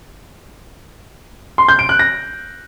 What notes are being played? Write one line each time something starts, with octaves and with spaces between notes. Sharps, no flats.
C6
G6
D7
F#6
A#6